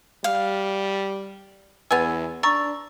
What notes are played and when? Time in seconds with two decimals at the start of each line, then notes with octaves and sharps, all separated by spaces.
0.24 G3 F5
1.91 E2 B3 G#5 E6
2.43 D4 A#5 C#6 E6 A6